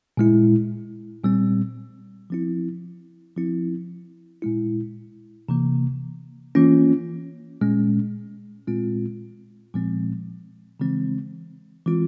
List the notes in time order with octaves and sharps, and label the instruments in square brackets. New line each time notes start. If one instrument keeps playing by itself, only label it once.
[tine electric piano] A#2 G#3 E4
A#2 G3 C4
F3 C4 E4
F3 C4 E4
A#2 G#3 E4
C3 E3 A#3
E3 A#3 C#4 F4
A#2 G#3 C#4
A#2 G#3 C4 F4
A#2 F3 G#3 C4
C#3 E3 G#3 C4
E3 G#3 C4 F4